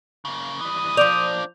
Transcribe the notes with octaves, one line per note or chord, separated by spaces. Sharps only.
C#3 A#3
E3 G3 D#6
F3 A#3 D4 D5 D6 G6 F7